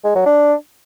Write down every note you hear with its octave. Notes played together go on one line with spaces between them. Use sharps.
G#3
F#3
D4